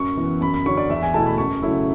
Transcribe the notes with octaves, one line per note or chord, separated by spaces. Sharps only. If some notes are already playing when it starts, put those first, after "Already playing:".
Already playing: F#2 C#6
E3 B3
F#2 B5
B5
D3 F#3 C#4 C#6
D5
E2 E5
G#5
B2 A3 E4 A5
B5
F#2 C#6
C#3 F#3 A3 E4